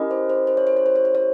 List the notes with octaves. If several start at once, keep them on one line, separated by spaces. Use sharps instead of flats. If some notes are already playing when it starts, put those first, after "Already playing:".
Already playing: C#4 E4 G4 A#4 D#5
C5
C5
C5
C#5
C5
C#5
C5
C#5
C5
C#5